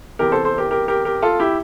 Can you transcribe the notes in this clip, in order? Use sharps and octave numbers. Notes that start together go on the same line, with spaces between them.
E2 C3 E3 G4 A#4
A4 C5
A4 C5
G4 A#4
G4 A#4
G4 A#4
G4 A#4
F4 A4
E4 G4